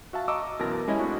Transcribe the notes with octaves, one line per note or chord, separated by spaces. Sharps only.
F#4 E5 F5 A5
D#5 A#5 C#6 D6 E6
F#2 B2 E3 A#4 A5 A#6
G#3 C#4 E4 G4 D#5
A2 C4 D4 F#4